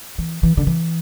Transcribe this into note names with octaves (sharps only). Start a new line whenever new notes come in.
E3
E3
D3
E3